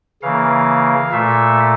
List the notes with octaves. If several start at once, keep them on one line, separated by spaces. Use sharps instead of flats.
C#3 E3 A#3 F5
A#2 A3 E5